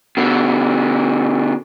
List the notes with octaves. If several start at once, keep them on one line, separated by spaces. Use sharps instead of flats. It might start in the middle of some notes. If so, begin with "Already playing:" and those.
B2 D3